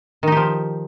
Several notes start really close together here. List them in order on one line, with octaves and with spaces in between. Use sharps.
D#3 D#4 G4 F3